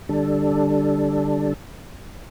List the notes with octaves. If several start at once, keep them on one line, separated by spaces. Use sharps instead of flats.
D3 G3 D4 A4